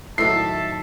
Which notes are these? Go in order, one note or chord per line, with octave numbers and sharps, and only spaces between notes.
A2 D#3 F#3 A4 E5 A5 C7